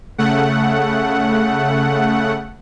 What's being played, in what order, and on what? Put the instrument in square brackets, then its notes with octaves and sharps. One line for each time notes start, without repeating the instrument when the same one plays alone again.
[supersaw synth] C#3 A3 F#5